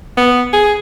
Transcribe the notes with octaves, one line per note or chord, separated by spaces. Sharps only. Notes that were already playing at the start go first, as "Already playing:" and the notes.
B3
G#4